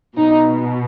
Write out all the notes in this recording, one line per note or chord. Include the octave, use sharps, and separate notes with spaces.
B2 D#4